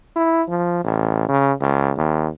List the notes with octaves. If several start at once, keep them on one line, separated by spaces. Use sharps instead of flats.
E4
F3
A1
C#3
C#2
D#2